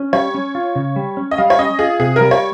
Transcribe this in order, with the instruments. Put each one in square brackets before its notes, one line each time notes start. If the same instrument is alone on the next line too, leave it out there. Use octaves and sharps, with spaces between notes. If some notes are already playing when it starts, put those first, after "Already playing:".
Already playing: [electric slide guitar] C#4
[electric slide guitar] G3 [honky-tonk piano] C#5
[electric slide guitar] C#4
F4
C#3
G3
C#4
[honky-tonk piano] D#5
[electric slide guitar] G3 [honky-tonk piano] F5
[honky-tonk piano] C#5
[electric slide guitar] C#4 [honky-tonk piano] D#5
[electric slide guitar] F4 [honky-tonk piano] G#4
[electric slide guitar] C3 [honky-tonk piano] G#4
[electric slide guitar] G3 [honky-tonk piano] A#4
[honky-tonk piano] C#5